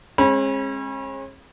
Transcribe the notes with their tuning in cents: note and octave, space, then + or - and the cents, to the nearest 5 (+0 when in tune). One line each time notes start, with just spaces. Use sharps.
G#3 +0 C#4 -45 B5 -30